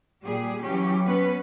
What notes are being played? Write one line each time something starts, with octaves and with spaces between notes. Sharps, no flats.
A#2 G3 G4 G#4
E3 F#3 C#4 G4
B3 C#4 B4